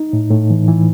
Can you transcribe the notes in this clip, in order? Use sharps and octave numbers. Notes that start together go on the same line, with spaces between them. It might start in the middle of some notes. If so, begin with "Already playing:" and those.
Already playing: D#4
A2
A2
E3
E3